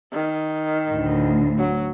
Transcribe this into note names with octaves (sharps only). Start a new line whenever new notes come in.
D#3
D2 A2
F#3